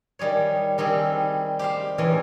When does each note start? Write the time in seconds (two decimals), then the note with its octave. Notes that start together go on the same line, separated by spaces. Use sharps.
0.19 D#3 G3 G#4 C#5
0.78 D#3 G3 C4 G#4 A4
1.59 G4 C5 F5
1.98 E2 E3 C#4